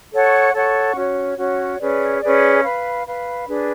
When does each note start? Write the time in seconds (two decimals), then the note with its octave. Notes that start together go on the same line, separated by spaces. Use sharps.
0.12 A4 C#5 F#5 C#6
0.54 A4 C#5 F#5 C#6
0.96 C#4 F#4 C#5
1.38 C#4 F#4 C#5
1.79 C#4 G#4 B4 D5
2.22 C#4 G#4 B4 D5
2.63 B4 F5 B5
3.05 B4 F5 B5
3.47 D4 G#4 B4